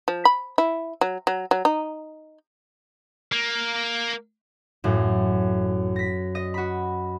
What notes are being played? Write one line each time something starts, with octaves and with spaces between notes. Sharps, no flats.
F3
B5
E4
F#3
F#3
F#3
D#4
A#3
A1 F#2 A2
A#6 B6
D#5
F#4 B5